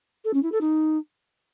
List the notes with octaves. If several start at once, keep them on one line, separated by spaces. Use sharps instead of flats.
A4
C#4
E4
A4
D#4